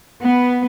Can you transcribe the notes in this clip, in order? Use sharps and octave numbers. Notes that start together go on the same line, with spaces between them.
B3